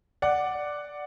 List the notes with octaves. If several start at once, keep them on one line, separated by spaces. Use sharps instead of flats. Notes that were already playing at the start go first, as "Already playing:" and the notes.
D5 F#5